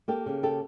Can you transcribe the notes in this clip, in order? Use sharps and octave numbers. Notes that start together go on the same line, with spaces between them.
A#3 G4 A4
C#3
G4 A4